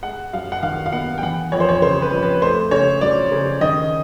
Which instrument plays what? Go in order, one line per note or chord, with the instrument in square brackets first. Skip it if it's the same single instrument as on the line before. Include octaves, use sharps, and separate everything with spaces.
[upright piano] G#3 F#5
F#2 F5
F#5
D#3 F5
F5
B3 F#5
G5
E3 F#5
F2 C#5
C5
C#5
C#3 C5
B4
F2
B4
A3 C5
C#3 C#5
F#3 D5
C#3
D#3 D#5